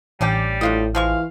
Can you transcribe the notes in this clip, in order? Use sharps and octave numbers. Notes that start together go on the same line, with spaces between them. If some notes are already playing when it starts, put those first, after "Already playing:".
A1 G3 C#4 D4 G4
A2 D4 F4 D#5
E3 F3 G#3 F5 C#6